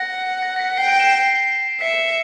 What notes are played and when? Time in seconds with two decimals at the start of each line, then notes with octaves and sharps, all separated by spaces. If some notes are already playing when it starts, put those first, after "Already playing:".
Already playing: F#5 A#6
0.42 A#6
0.56 A#6
0.59 B6
0.77 G5 C7
0.88 C7 D7
1.00 D7 E7
1.11 C7 D7
1.81 E5 B6 C#7
1.98 B6